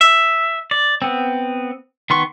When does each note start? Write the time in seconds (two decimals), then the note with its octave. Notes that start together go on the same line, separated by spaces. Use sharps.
0.01 E5
0.71 D5
1.02 B3 C4
2.10 D#3 B3 C6 C#6